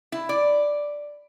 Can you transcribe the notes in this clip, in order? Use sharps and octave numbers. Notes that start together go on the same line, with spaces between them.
E4
D5